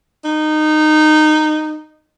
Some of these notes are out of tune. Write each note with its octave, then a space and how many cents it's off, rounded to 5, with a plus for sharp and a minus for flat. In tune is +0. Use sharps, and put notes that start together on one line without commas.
D#4 -15